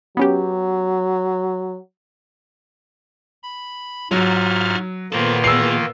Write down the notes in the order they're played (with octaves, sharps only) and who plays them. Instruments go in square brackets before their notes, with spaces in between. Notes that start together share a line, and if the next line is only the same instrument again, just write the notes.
[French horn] F#3 [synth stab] B3 C#4 G4
[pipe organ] B5
[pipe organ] G#2 F6 [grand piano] F#3 [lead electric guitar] F4 F#4
[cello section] A#2 B3 [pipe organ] D#3 A#3 F4 [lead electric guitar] A4 C5
[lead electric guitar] E3 G#4 [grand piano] E6 C7